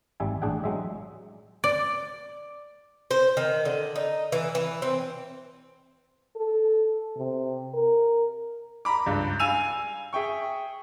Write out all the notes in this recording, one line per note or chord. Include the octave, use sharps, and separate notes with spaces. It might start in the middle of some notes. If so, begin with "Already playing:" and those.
G#1 G3 E5 G#5
A1 D4 G#4 F#5 G5
F#3 G#3 E5
D5
C5
D#3
D3
D#4
E3
E3
C4
A4
C3
A#4
A#5 B5 D6
C#2 G2
F5 G#5 E6 D#7 F7
G#4 E5 G5 C#6